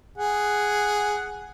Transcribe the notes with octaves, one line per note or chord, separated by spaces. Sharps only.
G#4 F#5